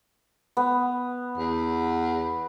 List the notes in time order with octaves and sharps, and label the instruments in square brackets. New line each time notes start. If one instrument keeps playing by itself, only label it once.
[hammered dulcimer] B3
[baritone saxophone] E2